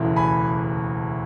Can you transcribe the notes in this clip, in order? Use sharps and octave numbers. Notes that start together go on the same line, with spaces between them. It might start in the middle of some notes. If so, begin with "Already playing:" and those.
Already playing: E1 D2 C#3 E3 A3
G#5 B5